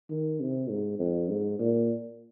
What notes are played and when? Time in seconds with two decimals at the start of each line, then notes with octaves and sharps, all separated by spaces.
0.10 D#3
0.40 C3
0.70 G#2
0.99 F2
1.29 G#2
1.59 A#2